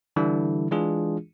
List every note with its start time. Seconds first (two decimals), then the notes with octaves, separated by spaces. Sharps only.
0.16 D3 E3 G3 D4 E4
0.71 E3 G#3 D4 F4 G#4